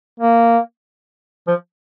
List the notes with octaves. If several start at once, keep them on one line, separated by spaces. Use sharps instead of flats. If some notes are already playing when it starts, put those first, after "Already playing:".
A#3
F3